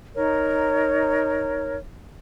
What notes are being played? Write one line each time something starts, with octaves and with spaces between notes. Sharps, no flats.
D#4 A#4 C#5